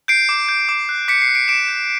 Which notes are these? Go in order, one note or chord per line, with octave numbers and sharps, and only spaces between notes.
G6 C7 D7
D6
G6
D6
F#6
D6 B6 C#7
C7
F#6
C7 D7
D6 D7 E7
G6